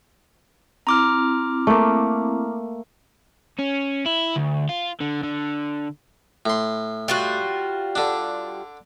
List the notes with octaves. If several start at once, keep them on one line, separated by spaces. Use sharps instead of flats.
C4 E4 A#5 D6 F6
A3 A#3
C#4
E4
D2
F4
D3
D3
A2 C6
G3 F4 F#4
D3 D4